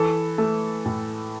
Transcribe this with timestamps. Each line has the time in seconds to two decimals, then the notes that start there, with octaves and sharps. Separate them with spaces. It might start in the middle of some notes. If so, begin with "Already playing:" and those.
Already playing: E3 A4
0.38 A3
0.86 A2